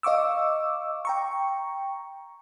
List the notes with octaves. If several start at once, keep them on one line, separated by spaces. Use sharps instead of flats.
D#5 F5 C#6 D6 E6
G5 A#5 C#6